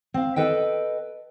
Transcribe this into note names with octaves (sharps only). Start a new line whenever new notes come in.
C4 F5
A4 B4 D#5 G5